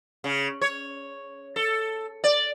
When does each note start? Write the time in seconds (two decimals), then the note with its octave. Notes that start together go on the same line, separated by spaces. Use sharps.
0.24 C#3
0.61 C#5
1.56 A4
2.24 D5